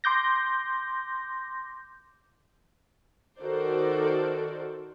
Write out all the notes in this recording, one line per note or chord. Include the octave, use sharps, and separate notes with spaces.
C6 D6 G6 A#6
D#3 F#4 A4 A#4 C5 D5